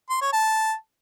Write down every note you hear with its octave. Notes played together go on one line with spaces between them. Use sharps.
C6
C#5
A5